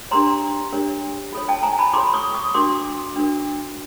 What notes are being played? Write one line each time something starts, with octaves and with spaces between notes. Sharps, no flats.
D4 G4 A#4 C#5 A#5 C6
D4 G4 A#4 C#5
F4 A4 C#5
G5 A5
G#5 A#5
A5 B5
F4 A4 C#5 C6 D6
C#6 D#6
C#6 D#6
D4 F#4 A#4 C6 D6
D4 F#4 A#4